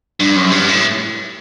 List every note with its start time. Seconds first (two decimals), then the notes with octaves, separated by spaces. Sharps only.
0.20 G2
0.36 F#2
0.52 G2
0.68 A2